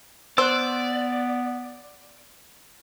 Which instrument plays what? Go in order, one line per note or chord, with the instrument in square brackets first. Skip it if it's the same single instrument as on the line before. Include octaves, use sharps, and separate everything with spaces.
[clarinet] B3 [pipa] C5 [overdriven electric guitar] D5 [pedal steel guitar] E6 F#6